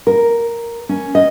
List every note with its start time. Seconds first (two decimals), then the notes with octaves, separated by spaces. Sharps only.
0.07 A#4
0.89 C#4
1.15 D#5